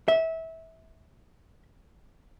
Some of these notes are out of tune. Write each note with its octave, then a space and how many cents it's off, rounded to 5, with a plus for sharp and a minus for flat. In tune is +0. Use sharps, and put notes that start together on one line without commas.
E5 -20